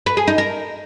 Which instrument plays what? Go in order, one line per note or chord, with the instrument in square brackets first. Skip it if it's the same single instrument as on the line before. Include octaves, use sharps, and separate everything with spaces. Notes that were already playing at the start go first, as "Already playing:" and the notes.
[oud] B4
G#4
D#4
A#4